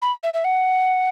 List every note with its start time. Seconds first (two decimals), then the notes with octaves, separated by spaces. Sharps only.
0.02 B5
0.23 E5
0.34 E5
0.44 F#5